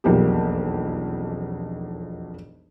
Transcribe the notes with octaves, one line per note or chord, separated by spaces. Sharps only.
E1 B1 F2 A#3 G4